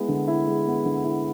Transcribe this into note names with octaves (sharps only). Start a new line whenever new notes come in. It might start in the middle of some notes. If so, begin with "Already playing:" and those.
Already playing: G#3 B3 E4
D3
E4
G#3
B3
D3
E4